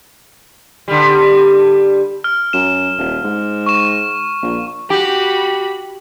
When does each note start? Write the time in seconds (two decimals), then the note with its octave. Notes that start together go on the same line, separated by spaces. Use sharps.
0.88 D3 G3
2.24 F6
2.53 F#2 E7
2.98 D#1
3.24 G#2
3.66 C#6 E7
4.42 A#1
4.90 F#4 G4 B5